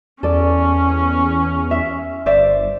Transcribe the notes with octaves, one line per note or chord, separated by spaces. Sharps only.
E2 C#4 A4 D5
E5
G1 C5 D5 E5